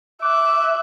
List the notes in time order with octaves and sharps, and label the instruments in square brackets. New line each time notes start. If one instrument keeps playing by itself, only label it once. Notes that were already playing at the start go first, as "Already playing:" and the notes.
[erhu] E5 [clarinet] D6 [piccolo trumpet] F#6